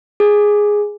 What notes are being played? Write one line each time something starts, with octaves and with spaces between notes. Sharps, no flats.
G#4